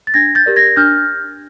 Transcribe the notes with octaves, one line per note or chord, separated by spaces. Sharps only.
A6
D4 G#6 A#6
G6 A6
G4 A#4 D5
G#6 A#6
D4 F6 G6